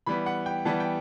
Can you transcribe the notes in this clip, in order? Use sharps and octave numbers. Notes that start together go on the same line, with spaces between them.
E3 G3 B3 B5
F#5
G5
E3 G3 B3 A5
G5